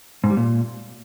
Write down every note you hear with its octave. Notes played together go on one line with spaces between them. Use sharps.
G#2
G3
A#2